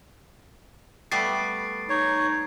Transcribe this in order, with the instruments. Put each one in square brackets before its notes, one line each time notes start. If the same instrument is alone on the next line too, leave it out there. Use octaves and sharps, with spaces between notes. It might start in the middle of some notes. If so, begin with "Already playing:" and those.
[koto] G3 A3 B3 [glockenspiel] A6 C7 D7
[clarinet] D#4 [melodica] C#5